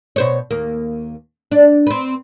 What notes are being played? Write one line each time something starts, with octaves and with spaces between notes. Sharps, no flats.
B2 C5 C#5
D#2 A#3
D4
C4 B4